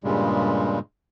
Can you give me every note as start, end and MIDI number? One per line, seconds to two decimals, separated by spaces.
0.04 0.79 43
0.04 0.79 46
0.04 0.79 49
0.04 0.79 55
0.04 0.79 56